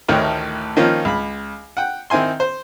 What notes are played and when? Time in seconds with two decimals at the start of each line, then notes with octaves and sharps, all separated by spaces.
0.08 A1 D2 A2 D#3 C#5 G5
0.77 D#3 F3 A#3 C#4 F4
1.05 C#2 B5
1.77 F#5 G5
2.10 D#3 C4 E4 G#5 C6
2.40 C5